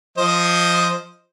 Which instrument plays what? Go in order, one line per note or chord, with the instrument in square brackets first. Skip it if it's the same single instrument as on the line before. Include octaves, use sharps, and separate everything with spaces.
[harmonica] F3 C5 D#5